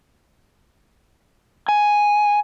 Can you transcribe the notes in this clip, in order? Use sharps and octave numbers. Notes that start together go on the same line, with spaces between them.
G#5